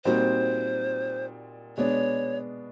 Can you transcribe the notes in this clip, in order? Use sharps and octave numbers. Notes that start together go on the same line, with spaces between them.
A#2 G3 C4 D#4 F#4 C5
B2 G#3 B3 D4 C#5